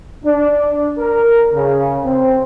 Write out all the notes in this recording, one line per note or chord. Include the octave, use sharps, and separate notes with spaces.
D4
A#4
C#3
C4